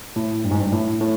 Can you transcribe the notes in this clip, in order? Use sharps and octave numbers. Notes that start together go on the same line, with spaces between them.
A2
G2
G#2
G2
A2
A2